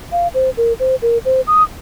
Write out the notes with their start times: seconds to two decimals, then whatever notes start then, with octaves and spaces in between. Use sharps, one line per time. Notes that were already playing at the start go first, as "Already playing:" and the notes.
0.12 F5
0.34 C5
0.57 A#4
0.80 C5
1.02 A#4
1.25 C5
1.47 D#6